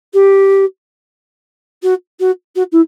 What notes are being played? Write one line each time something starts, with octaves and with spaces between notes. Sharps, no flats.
G4
F#4
F#4
F#4
E4